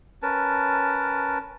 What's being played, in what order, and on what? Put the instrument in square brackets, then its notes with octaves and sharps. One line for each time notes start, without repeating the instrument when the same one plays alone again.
[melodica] C#4 A#4 B4 A5